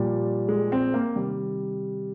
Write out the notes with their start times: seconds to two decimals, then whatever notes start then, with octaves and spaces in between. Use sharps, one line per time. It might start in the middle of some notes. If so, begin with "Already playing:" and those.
Already playing: A#2 F3 G3
0.48 G#3
0.72 C4
0.94 A#3
1.16 C3 D#3 G3